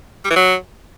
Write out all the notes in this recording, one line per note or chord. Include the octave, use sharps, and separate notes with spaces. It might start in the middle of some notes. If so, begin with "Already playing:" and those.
G3
E3
F#3